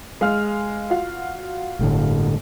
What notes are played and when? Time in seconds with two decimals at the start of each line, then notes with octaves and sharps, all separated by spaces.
0.21 G#3 F5 F6
0.90 F4 F#4 F5
1.79 G1 A2 D3